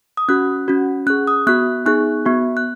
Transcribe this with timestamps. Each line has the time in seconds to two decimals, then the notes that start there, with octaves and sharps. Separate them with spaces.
0.17 D#6
0.29 C#4 F#4 F#6
0.68 C#4 F#4
1.07 C#4 G#4 F#6
1.27 D#6
1.47 B3 F#4 F#6
1.85 B3 D#4 G#4 F#6
2.26 B3 F#4
2.57 F#6